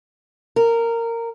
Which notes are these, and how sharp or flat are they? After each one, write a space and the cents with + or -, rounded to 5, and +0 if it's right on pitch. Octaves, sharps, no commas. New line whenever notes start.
A#4 -15